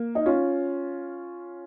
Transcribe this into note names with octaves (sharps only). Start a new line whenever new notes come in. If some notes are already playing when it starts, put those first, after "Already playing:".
Already playing: A#3
D#4
C#4 F4